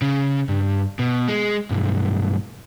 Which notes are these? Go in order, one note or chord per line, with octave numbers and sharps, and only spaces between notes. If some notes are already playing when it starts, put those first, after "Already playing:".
C#3
G2
B2
G#3
B1 G2